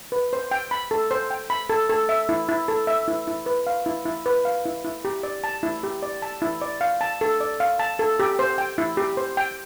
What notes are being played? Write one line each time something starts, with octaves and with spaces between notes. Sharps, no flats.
B4
C5
G5
B5
A4
C5
G5
B5
A4
A4
E5
E4
E4
A4
E5
E4
E4
B4
F5
E4
E4
B4
F5
E4
E4
G4
D5
A5
E4
G4
D5
A5
E4
D5
F5
A5
A4
D5
F5
A5
A4
G4
C5
G5
E4
G4
C5
G5